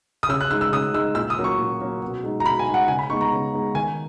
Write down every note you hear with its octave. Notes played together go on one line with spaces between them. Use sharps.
D#6
C#3 E6
F#6
G#3 D#4 E6
E6
C#3 D#6
G#3 D#4 E6
A#2 E6
D#6
F#3 A#3 C#4
C#6
A#2
F#3 A#3 C#4
B2
G#3 D#4
A#5
B2 B5
G#5
G#3 D#4
F#5
C#3 G#5
B5
G#3 B3 D#4 C#6
A#5
C#3
G#3 B3 D#4
D#3 G#5